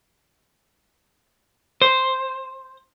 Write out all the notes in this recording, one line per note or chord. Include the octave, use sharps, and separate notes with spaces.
C5